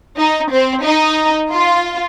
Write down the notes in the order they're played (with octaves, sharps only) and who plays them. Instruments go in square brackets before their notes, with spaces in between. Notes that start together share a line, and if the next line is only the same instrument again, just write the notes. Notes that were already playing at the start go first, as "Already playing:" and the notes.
[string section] D#4
C4
D#4
F4